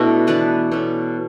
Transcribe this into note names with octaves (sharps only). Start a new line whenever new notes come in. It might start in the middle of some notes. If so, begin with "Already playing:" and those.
Already playing: B2 A3 D4 E4 F#4
E3 B3 D4 B4 D5
B2 A3 C#4